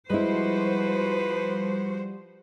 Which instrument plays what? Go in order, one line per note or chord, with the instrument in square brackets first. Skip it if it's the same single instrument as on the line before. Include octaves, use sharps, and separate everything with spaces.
[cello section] F3 F#4 C5 [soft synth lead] G3 [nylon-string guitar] G#3 E4 [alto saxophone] B4